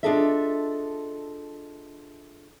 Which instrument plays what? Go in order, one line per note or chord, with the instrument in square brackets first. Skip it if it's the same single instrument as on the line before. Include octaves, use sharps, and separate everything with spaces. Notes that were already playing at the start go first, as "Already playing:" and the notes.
[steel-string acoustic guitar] D4 F4 G#4 A4 D#5 E5